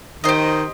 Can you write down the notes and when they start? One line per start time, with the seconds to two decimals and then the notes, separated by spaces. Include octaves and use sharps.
0.24 D#3 G4 C5 D#5